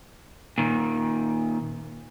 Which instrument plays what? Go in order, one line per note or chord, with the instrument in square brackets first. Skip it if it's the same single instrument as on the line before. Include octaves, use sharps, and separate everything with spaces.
[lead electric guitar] A#2 D#3